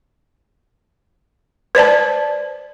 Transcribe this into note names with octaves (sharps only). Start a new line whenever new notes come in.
B4 C5 D5 A5